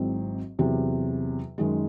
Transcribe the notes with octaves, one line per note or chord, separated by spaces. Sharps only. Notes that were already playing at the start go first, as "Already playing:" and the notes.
Already playing: G#1 G#2 F#3 C4 E4
E2 C3 F#3
F#2 D#3 G#3